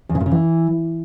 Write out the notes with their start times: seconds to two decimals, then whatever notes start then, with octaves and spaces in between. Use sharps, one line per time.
0.09 E2
0.15 C#3
0.20 A#2
0.26 C#3
0.31 E3